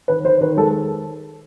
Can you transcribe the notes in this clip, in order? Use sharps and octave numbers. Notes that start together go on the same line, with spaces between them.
D#3 B4
D#3 C5
D#3 B4
G#3 A4